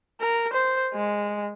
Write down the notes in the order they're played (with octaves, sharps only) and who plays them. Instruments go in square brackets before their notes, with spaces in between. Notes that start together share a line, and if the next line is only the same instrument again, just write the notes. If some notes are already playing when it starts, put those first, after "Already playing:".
[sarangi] A#4
C5
G#3